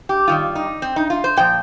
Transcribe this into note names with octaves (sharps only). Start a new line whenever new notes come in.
G4
G2 D#3 G3 F4
D#4
C4
D#4
F4
C5
A#2 F3 G5